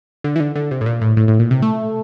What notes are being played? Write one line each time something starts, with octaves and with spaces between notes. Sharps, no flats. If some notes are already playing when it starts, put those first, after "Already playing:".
D3
E3
D3
D3
C3
A2
A#2
A2
A2
A2
A#2
C3
A3